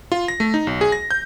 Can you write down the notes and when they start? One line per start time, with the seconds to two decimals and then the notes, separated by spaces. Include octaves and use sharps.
0.12 F4
0.28 A#6
0.40 A3
0.54 D#4
0.67 B1
0.81 G#4
0.92 A#6
1.11 G6